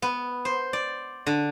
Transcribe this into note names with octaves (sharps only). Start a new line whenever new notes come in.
B3
C5
D5
D3